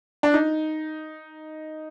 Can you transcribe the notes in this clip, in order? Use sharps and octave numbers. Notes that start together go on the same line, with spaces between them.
D4
D#4